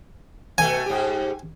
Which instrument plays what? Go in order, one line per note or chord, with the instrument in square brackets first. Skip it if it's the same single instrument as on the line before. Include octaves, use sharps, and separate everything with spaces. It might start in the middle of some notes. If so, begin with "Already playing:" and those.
[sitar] B2 A3 [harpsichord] G#5
[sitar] G#2 G4